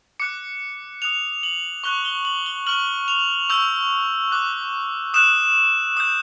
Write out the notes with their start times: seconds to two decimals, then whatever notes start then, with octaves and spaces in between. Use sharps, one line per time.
0.20 D6 F#6 C#7
1.02 D#6 F#6 F7
1.43 F#7
1.84 C#6 F#6 G7
2.05 G7
2.25 F#7
2.46 G7
2.67 C#6 F6 F#7
3.08 F7
3.50 C#6 E6 G6 F7
4.32 D6 F#6
5.14 D#6 F#6 E7
5.97 D#6 G6